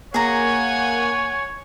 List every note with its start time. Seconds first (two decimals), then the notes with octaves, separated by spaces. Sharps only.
0.14 A#3 G#4 C#5 F#5 G#5 A#5